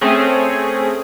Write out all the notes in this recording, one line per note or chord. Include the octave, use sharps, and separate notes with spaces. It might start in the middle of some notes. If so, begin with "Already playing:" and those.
A3 C4 C#4 G#4